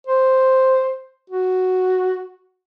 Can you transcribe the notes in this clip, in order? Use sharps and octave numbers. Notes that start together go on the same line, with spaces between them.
C5
F#4